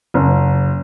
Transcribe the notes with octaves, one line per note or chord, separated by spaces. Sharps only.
F#1